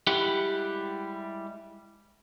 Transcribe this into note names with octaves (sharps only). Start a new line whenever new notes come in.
G3 G#3 E4 G4 F#5